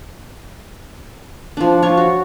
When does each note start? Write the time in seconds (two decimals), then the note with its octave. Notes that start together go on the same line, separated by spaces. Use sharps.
1.57 F3 D4
1.82 F4 C#5 F5 C#6
1.97 F#4